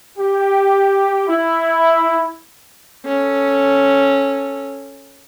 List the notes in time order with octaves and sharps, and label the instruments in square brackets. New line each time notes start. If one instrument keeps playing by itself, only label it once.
[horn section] G4
E4
[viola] C#4 A4